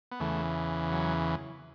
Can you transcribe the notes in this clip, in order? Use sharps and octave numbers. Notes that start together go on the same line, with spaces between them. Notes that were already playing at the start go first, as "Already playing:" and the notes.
B3
E2 C#3 E3 A3
F#3